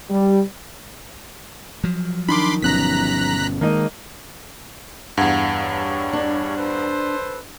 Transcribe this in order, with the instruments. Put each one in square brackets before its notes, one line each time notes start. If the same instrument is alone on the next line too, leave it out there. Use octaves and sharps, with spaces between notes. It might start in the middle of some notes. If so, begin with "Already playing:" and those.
[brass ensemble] G3
[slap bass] F3 F#3
[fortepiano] D#3 [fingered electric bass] D4 [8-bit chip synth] B5 C6 D6
[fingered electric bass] G1 B2 C#4 [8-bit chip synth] A#5 F#6 B6
[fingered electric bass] D#3 G#3 [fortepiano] A#3 D#4 D#5
[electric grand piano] E2 G2 [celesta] F5 F#5 G#6
[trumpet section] G3 C#5
[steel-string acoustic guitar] D4
[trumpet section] A4 B4 C5